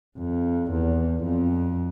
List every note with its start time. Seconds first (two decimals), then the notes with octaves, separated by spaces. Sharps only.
0.18 F2
0.72 E2
1.24 F2